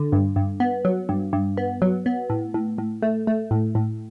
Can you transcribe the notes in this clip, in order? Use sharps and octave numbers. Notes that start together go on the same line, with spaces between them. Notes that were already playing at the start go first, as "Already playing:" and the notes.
Already playing: D3
G2
G2
B3
F#3
G2
G2
B3
F#3
B3
A2
A2
A2
A3
A3
A2
A2